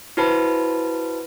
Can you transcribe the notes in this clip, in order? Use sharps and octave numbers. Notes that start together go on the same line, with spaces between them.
E4 F#4 B4 C5 A5 B5